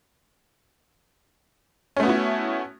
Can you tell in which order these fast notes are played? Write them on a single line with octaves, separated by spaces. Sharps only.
C#4 A3 B3 F#4 E4